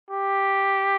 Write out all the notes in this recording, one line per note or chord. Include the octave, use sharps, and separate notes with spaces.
G4